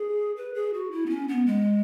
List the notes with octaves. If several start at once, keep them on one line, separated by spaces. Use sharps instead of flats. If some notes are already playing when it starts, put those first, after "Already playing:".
Already playing: G#4
B4
G#4
F#4
E4
B3
C#4
B3
G#3